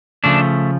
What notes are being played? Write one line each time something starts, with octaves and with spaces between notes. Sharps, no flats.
C#3 F3 A3 D4